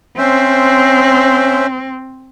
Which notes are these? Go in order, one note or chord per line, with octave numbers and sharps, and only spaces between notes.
C4 C#4 C5 E5